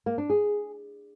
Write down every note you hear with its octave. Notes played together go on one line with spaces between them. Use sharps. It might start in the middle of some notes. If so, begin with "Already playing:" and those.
A#3
D4
G#4